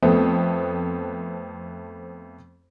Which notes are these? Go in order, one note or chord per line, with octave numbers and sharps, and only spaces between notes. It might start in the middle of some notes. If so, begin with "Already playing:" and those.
F2 A3 B3 C4